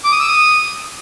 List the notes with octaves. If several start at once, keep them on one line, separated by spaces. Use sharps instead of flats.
D6
D#6
E6
D#6